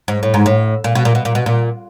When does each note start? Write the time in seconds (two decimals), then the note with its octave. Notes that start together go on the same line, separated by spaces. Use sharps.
0.08 G#2
0.23 A2
0.34 G#2
0.46 A2
0.84 A#2
0.95 B2
1.05 A#2
1.15 B2
1.25 A#2
1.35 B2
1.46 A#2